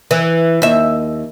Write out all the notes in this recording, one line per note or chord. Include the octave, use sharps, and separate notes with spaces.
E3
D#2 E5